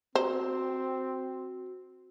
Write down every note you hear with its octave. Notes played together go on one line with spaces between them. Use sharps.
C4 F#4 C5